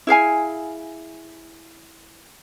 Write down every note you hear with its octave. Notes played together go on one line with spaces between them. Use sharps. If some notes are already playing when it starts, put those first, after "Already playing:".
E4 G#4 F5 G#5